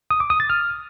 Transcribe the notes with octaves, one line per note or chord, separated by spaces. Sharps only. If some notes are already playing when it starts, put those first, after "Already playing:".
D#6
D6
D#6
A6
F6